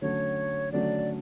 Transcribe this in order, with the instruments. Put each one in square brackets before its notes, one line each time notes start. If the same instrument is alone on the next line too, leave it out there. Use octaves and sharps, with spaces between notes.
[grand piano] D3 F#3 A3 C#4 [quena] C#5
[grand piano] D3 F#3 A3 C#4 [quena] D5